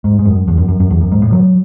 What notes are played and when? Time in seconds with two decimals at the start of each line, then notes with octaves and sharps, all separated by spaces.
0.04 G#2
0.19 G#2
0.25 F#2
0.48 E2
0.58 F#2
0.68 F#2
0.80 F#2
0.90 E2
1.01 F#2
1.12 G#2
1.22 A2
1.32 F#3